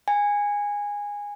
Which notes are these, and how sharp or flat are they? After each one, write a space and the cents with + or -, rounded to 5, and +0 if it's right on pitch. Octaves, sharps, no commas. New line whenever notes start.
G#5 -15